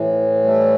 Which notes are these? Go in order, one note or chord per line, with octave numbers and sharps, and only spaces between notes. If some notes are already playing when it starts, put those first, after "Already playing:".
Already playing: A2 E3
G3 A3